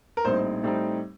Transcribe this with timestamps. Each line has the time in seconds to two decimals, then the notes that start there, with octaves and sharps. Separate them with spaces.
0.17 A#4
0.25 A#1 A2 G3 C4 D#4 C5
0.63 A2 G3 C4 D#4